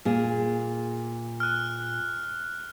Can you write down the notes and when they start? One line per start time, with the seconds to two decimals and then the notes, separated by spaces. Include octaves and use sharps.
0.05 A#2 G#4
1.40 F6 F#6